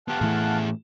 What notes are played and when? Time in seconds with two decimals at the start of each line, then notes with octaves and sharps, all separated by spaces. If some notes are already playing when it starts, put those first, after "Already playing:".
0.08 B3 G4 F5 F#5 A5
0.21 A2 E3 A3 E4 G#4